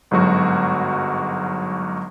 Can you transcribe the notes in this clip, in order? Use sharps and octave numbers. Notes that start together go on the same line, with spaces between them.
G1 G#2 F#3 F#4